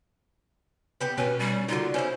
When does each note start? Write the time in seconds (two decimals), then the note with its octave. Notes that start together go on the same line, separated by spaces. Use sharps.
1.01 B3 G4 B4
1.18 B2 C#4 B4
1.39 G3
1.69 D3 A#3 D#4 F4 F#4
1.94 C#4 E4 C5